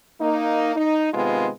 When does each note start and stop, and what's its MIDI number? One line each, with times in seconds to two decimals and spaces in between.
0.20 0.74 58
0.20 0.74 63
0.75 1.08 63
1.13 1.48 48
1.13 1.48 51
1.13 1.48 56
1.13 1.48 59
1.13 1.48 65